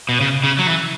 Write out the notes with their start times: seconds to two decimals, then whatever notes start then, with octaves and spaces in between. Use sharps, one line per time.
0.09 B2
0.21 C#3
0.44 C#3
0.59 F#3
0.67 E3